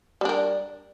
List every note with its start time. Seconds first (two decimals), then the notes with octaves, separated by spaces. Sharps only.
0.21 G3
0.25 D4
0.29 A#4